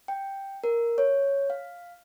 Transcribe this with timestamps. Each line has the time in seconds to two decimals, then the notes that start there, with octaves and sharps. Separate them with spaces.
0.08 G5
0.64 A#4
0.98 C#5
1.50 F5